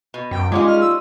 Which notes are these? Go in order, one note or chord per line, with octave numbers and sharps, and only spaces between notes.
B2
F#2 G5
G3 G#3 C#4 D#4 F4 D6
F6
E6